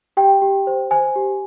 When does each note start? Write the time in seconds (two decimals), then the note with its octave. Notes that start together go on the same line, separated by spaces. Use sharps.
0.17 G4 G5
0.42 G4
0.67 C5
0.91 C5 G#5
1.16 G4